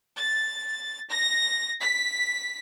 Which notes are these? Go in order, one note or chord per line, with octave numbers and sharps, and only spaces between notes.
A6
A#6
B6